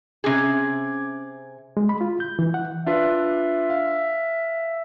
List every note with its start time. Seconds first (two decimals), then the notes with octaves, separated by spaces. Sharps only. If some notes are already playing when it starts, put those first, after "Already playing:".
0.24 C3 C#4 G#4 D6 G#6
1.77 G#3
1.89 B5
2.01 F4
2.20 G6
2.39 E3
2.54 F#5
2.86 D4 F4 B4 E5
3.70 F5